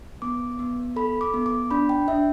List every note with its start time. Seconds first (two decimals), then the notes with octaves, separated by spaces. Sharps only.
0.22 B3 D6
0.59 B3
0.96 A4 B5
1.21 D6
1.34 B3
1.46 D6
1.71 D4 B5
1.89 G5
2.08 D4 E5